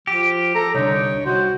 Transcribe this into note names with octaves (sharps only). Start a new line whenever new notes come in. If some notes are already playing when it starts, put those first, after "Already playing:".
F3 G4
A4 A#5
C2 D3 D#4 C#5
C2 D#4 F#4 C5